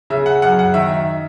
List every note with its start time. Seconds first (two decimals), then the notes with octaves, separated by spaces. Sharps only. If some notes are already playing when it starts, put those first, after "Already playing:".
0.10 C#3 E5
0.26 F#5
0.42 F#2 F#5
0.59 F#5
0.74 D#3 E5